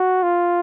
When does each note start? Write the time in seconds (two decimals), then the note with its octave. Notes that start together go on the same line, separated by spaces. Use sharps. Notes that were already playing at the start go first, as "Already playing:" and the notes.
Already playing: F#4
0.23 F4